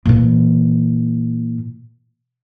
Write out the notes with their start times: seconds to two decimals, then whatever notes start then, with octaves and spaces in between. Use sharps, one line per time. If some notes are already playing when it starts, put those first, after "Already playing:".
0.06 A#2 E3